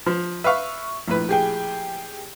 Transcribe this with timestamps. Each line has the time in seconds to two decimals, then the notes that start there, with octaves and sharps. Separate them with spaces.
0.06 F3
0.44 B4 E5 F5 C#6
1.08 A#1 A2 B4
1.29 G4 G#4 G5